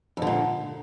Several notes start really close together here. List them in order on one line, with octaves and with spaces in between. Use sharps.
F2 D3 A#2